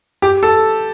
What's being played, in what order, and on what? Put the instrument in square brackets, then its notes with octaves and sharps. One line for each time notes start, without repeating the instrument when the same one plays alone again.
[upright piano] G4
A4